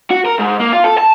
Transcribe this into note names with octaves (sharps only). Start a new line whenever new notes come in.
F#4
A#4
G#2
A#3
F4
A4
A5